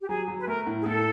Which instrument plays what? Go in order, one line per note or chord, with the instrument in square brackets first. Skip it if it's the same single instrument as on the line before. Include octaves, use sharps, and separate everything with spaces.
[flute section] G4
[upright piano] F#3 [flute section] G#4
[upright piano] F#3
[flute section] B4
[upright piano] A3 [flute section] A#4
[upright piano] A2
[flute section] G#4
[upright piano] A2 [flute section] A4